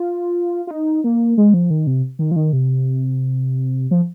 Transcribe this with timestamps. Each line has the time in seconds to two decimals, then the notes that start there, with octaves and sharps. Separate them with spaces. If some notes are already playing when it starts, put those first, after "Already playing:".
Already playing: F4
0.67 F4
0.71 D#4
1.04 A#3
1.38 G#3
1.54 F3
1.70 D#3
1.87 C3
2.19 D#3
2.31 F3
2.36 D#3
2.53 C3
3.91 F3